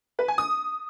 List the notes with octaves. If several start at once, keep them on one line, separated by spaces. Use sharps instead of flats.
B4
G#5
D#6